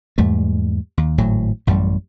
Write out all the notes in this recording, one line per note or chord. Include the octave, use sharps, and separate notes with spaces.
E2 G#2 G3 A3
D#2
G#1 A2 F#3
A1 F#2 G3